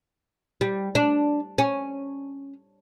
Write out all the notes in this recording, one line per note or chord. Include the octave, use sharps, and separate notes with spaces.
G3
D4
C#4